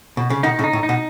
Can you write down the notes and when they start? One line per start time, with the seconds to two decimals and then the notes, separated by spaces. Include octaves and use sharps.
0.17 B2
0.30 C#3
0.43 B2 D#3 D#4
0.59 A2 C#3
0.64 D#4
0.73 A2
0.83 D#4
0.89 B2